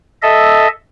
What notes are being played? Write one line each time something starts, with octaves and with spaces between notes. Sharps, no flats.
A4 D#5 E5